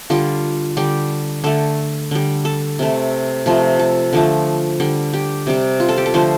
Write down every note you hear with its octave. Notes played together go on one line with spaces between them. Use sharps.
D3 G3 F4
D3 G3 G4
D3 A3 A4
D3 G3
A4
C3 A3
C3 F3 A3
A4
D3 F3 A3
D3 G3
G4
C3 G3
F4
A4
G4
A4
D3 F3 A3 C5